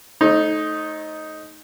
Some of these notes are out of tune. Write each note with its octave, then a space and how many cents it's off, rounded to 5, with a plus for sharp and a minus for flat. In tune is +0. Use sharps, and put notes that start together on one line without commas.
A3 -25 D#4 +0 C5 +45